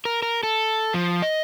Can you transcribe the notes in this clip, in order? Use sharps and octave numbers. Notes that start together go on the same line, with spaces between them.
A#4
A#4
A4
F3
D#5